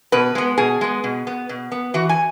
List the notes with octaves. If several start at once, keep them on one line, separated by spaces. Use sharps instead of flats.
B2 B4
G#3 B3
B2 G#4
G#3 B3
B2
B3
B2
B3
E3 F#4
G#5